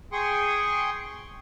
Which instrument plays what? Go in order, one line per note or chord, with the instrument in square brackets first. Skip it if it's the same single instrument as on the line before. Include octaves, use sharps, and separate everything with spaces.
[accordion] G#4 G5 C6 C#6 D#6